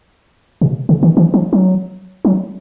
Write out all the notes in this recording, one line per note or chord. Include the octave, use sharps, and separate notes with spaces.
B2
C#3
D#3
E3
F3
F#3
F#3